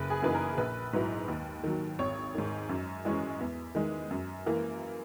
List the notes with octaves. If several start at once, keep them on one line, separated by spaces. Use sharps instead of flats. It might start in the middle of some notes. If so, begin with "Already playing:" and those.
Already playing: F#1 B4
G#4
F#2 E3 A#3 D#4 B4
A#4
A#1 B4
G#2 F#3 B3 E4
D#2
D#3 F#3
G#1 C#5
G#2 D#3
F#2
E3 G#3 C#4
E2
D#3 G#3
F#2
E3 A#3